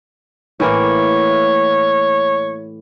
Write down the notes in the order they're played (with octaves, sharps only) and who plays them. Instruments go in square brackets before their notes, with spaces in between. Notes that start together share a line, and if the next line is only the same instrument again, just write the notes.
[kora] A2 E3 A#3 [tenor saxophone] C#5